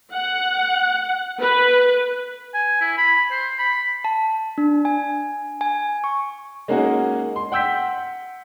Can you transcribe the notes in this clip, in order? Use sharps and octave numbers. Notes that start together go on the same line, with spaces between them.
F#5
B4
G#5
E4
B5
C5
B5
A5
D4
G#5
G#5
C#6
G#3 A#3 C#4 D#4 F#4 G#4
C6
F#5 G5 E6 G6 B6